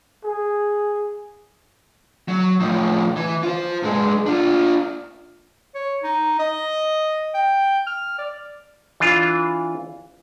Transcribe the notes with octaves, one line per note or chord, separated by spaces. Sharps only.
G#4
F#3
A2 F3
E3
F4 C5
G2 G#3
D4 F4
C#5
D#4
D#5
G5
F6
D5
E3 D4 F4